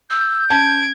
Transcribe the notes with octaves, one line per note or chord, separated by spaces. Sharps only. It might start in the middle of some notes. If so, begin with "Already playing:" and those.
E6 G6
C#4 A5 G#6 D7